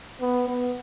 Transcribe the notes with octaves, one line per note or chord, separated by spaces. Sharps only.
B3
B3